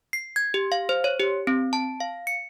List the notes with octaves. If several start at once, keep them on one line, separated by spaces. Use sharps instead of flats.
C7
G#6
G4
F5
C5
C#5
G4
C4
A5
F5
C#7